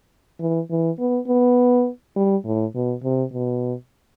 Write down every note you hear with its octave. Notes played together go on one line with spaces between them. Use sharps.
E3
E3
B3
B3
G3
A2
B2
C3
B2